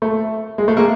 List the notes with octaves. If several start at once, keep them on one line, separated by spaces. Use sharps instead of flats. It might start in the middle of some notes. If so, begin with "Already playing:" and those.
A3
G#3
A3
G#3 A#3